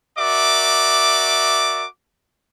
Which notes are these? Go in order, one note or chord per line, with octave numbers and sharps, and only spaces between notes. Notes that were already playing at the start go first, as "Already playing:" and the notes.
F#4 A#4 D5 E5 D6